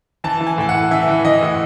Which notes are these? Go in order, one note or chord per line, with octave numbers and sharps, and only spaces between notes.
E3 A5
E3
G#5
A2 G#5
F#5
A2
E3 E5
E3
E3 D#5
A2